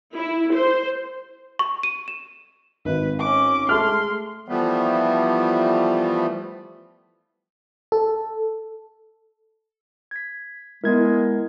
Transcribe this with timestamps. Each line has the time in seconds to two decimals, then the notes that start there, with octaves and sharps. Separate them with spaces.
0.15 E4
0.54 C5
1.59 C#6
1.83 D#7
2.08 E7
2.85 G#1 B4
3.19 C#4 D6
3.69 G#3 A3 C6 F6
4.48 E3 F3 G3 A3 B3
7.92 A4
10.11 G#6 B6
10.84 G#3 B3 E4 A#4 G#6